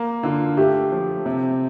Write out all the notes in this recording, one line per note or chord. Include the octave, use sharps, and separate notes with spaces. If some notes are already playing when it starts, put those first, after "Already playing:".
Already playing: A#3
D3 F4
A3 G4
F3
C3